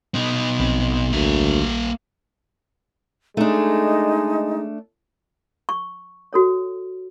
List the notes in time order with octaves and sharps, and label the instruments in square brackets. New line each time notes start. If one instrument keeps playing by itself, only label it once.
[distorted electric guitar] B2 D#4
[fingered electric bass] A#1 C4
[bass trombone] D2 [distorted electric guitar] A#3 E5
[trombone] G#3 [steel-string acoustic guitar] A3 D4 [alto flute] D#4
[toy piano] C#6
F#4 A4 C#5